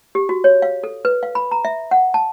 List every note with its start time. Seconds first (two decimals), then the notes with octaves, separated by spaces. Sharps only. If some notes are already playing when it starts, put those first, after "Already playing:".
0.15 G4
0.29 F#4
0.44 C#5
0.62 F5
0.83 A4
1.05 B4
1.23 F5
1.35 B5
1.51 A#5
1.65 E5
1.91 F#5
2.14 A5